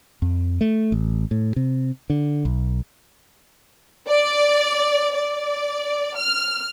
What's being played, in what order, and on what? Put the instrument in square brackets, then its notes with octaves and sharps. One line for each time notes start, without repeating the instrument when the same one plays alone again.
[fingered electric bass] F2
A3
A1
A2
C3
D3
B1
[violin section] D5
D5
F6